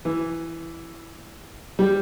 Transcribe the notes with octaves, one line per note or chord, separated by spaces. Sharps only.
E3
G3